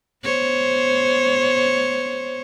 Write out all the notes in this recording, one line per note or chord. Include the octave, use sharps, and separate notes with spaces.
B3 C5 C#5